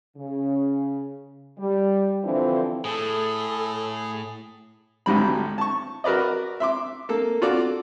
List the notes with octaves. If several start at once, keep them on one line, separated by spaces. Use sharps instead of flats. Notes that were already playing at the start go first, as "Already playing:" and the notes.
C#3
G3
D3 E3 F3 C4 D4 E4
A2 G#4 A4
G#1 D2 G#2 G3 B5
A5 C#6
F#4 A#4 B4 D5 D#5
E5 C6 D6
A#3 A4
F4 F#4 A4 D5